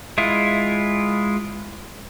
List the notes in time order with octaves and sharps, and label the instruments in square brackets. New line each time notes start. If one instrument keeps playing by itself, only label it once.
[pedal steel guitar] G#3 E4 F4